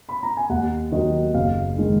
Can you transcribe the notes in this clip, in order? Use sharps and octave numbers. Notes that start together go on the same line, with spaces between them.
B5
A#5
G#5
D#2 F#5
D#3 F#3 D#5
F#1 F5
D#3 G#3